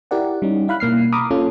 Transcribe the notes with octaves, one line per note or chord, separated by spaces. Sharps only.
E4 G4 A#4 D5 F#5
G3 C#4 D#4
E4 F5 B5 F#6
B2 A#3 F6 C7
A#5 B5 D6 D#6 F6
A#3 C#4 F4 A4